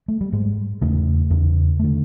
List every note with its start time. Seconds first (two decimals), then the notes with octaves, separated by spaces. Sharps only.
0.08 A3
0.21 G3
0.32 G#2 G#3
0.82 E2 C#3 A3
1.30 E2 C#3
1.79 D3 A3